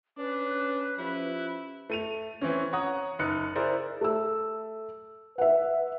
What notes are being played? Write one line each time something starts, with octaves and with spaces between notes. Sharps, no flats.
C#4 D4 B4
F3 C#4 E4 F4 G4
A3 D#7 F7
E3 C4 C#4
C#5 F#5 A#5 D#6
F#1 D#4 F#6 C#7
E4 G#4 A#4 C5 D5
A3 E6
B4 E5 F#5